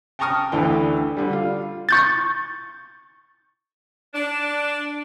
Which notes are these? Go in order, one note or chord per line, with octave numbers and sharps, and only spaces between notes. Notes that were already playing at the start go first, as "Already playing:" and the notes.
G5 A5 A#5 C#6 D#6 F6
D2 D3 E3 G5
D3 G3
F4
C#6 G6 A6
D4